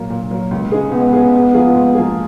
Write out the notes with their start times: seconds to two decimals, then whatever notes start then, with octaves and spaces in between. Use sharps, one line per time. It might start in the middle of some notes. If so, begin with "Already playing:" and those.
Already playing: A#2 F#3 A#3
0.10 A#2
0.31 F#3 A#3
0.51 C#2
0.72 C#3 G#3 D#4 G#4
0.92 C#2 B3
1.13 C#3 G#3 D#4 G#4
1.33 G#2
1.54 F3 A#3 F4 G#4
1.75 G#2
1.95 F3 A#3 F4 G#4